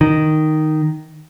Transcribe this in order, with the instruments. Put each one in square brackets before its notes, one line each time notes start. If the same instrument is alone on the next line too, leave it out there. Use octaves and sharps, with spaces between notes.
[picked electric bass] D#3